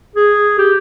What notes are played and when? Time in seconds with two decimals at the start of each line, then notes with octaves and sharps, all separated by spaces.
0.15 G#4
0.58 G4